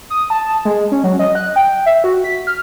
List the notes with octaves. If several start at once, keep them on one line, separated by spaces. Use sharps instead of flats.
D#6
A5
G#3
C#4
F#3
D#5
F#6
G5
E5
F#4
B6
F6